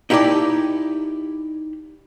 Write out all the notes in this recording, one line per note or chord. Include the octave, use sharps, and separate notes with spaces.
D#4 E4 G4 B4 D5 A5